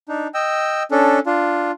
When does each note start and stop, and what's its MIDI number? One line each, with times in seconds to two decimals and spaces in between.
0.08 0.27 62
0.08 0.27 63
0.34 0.83 75
0.34 0.83 79
0.34 0.83 88
0.91 1.19 61
0.91 1.19 62
0.91 1.19 69
1.26 1.71 62
1.26 1.71 65